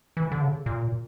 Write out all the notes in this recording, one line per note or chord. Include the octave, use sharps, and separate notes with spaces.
E3
D3
C#3
A#2